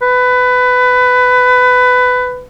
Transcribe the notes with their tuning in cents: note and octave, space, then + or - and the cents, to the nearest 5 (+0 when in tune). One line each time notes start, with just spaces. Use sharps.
B4 +20